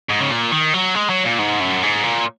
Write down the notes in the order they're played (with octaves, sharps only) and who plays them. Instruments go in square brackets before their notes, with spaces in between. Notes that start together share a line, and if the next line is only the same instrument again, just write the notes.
[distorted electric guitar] G#2
C#3
A#2
D#3
F#3
G#3
F#3
A#2
G#2
F#2
G#2
A#2